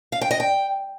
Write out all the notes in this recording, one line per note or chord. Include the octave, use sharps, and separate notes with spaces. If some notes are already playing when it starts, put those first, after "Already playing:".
F5
G5
D#5
G5